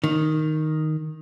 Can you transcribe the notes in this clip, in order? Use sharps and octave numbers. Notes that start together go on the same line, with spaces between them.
D#3